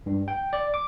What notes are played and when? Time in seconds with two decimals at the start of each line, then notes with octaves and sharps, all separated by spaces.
0.06 G2
0.28 G5
0.53 D5
0.74 D6